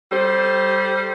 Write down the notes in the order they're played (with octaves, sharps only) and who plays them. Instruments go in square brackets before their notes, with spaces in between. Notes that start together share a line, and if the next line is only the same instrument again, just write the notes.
[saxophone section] G3 A4 C5